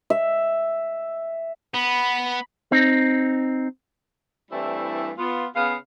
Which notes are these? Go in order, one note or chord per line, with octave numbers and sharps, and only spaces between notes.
E5
B3 B5
C4 D#4
G2 E3 G3 A3 C4 E4
B3 F4
C#3 B3 G#4 F5